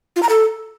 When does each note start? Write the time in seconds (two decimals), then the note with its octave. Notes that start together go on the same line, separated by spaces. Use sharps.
0.16 F4
0.23 A#5
0.29 A4